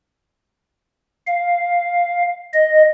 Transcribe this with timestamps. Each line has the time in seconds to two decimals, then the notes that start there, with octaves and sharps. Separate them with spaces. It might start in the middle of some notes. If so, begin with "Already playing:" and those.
1.27 F5
2.54 D#5